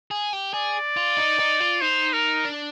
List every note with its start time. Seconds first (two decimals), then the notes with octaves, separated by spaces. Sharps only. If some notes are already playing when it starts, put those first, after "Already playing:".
0.11 G#4
0.33 G4
0.54 G#4 D5
0.97 F4
1.17 D#4
1.39 D#4
1.60 F4
1.81 D#4 C5
2.13 A#4
2.45 D4